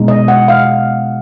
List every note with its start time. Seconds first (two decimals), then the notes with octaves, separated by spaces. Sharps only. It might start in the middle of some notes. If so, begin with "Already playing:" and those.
Already playing: B2 G#3 D#4
0.08 D#5
0.28 F#5
0.48 F5